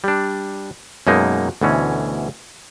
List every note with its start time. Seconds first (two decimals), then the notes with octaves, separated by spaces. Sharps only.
0.04 G3 D4
1.07 F#2 B2 G#3 A#3 D#4
1.61 D2 B2 E3 C#4